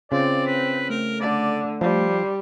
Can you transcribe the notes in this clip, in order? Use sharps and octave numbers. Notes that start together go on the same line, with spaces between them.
C#3 C4 F4 D5
B4
A3 A#4
D3 D5
F3 G3 C5